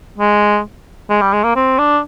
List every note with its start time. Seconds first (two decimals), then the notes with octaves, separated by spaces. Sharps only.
0.18 G#3
1.09 G#3
1.21 G3
1.33 G#3
1.44 A#3
1.56 C4
1.79 D4